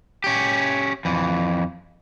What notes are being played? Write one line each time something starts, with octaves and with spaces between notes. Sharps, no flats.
C#4 G4
F2 E3